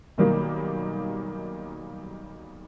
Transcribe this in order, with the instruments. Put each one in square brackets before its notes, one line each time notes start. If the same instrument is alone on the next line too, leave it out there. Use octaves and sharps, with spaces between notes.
[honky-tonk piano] B1 D#3 G3 A#3